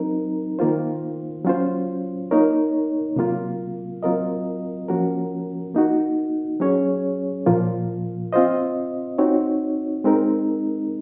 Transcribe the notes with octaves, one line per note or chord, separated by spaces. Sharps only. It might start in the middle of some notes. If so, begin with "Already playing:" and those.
Already playing: F#3 C4 D#4 A#4
D#3 A#3 F4 C5
F#3 C#4 F4 C5
A#3 D#4 A#4 C#5
C3 F#3 A#3 F4
F#3 C4 F4 A#4 D#5
F3 A#3 C#4 F#4 A#4
A#3 D#4 F#4
F#3 C#4 G#4 C#5
A#2 F3 A#3 F4
C4 F4 C5 D#5
C4 D#4 F#4 C#5
G#3 C4 D#4 A#4